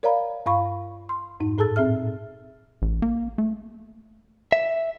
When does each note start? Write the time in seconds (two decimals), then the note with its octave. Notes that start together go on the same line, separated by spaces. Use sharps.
0.03 A#4 C#5 D5 F5 A#5 B5
0.46 G2 F5 B5 C#6
1.09 C6
1.40 F2 G#2 D#4
1.58 A2 G#4 A4 A5 E6 A6
1.76 A#2 C4 G#4 E5 F6
2.82 A1
3.02 A#3
3.38 A3
4.52 E5